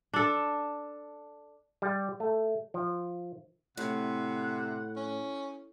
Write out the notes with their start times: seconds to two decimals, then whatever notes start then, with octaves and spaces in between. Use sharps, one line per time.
0.14 D4 A4
1.82 G3
2.20 A3
2.74 F3
3.77 A2 C3 F#5
4.96 C#4